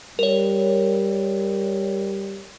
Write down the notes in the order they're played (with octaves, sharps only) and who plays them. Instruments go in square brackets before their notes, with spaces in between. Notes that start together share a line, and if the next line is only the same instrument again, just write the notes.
[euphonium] G3 [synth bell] A#4 C#5